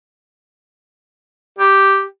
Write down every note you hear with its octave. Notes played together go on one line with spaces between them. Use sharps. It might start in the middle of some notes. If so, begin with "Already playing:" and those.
G4